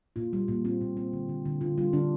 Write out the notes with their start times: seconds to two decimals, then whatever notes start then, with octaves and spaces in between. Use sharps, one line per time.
0.16 A#2 F4
0.33 G3
0.48 A#2
0.65 C4 F4
0.81 A#2
0.97 C4
1.13 D3
1.29 D3
1.45 D3
1.61 D3 F4
1.78 G3 F4
1.93 D3 D4